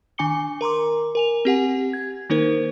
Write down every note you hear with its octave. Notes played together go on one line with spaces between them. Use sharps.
D#3 D4 G#5 D6 C#7 G7
A#4 A#5 C6 D6
A#4 G#5 F7
C4 G4 F#5 G#5
G#6
D#3 A#3 D#4 A#4 C5